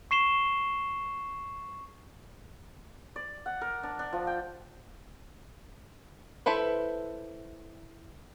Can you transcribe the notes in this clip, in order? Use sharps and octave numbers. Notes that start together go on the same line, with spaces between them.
C#6 C7 E7 G7
D5
F#5
A#4
D4
D4
F3
G5
E4 A4 B4 C5